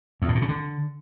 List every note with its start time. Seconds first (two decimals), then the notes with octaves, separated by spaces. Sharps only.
0.22 E2
0.28 A2
0.35 A#2
0.42 C#3
0.49 D3